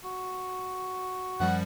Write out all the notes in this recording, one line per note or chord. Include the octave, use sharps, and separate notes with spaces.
F#4
F#2 F3 G3 F#5